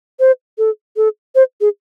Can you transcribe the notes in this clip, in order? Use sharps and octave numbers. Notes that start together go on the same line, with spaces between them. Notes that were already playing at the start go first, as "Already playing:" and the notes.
C5
A4
A4
C5
G#4